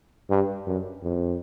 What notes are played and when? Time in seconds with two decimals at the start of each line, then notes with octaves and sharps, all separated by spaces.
0.30 G2
0.67 F#2
1.03 F2